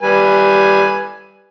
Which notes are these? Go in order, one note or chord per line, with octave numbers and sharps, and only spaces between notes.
G3 B4 G#5